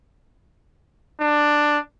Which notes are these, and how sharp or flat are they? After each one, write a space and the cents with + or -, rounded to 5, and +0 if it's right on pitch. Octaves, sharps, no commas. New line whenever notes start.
D4 +10